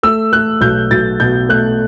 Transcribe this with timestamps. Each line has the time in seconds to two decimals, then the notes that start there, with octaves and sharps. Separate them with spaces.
0.03 A3 E6
0.33 A3 F#6
0.61 B1 G6
0.91 B1 A6
1.20 B2 G6
1.49 A3 F#6